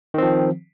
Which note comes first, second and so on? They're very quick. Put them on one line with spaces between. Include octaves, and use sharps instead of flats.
D#3 C4 F3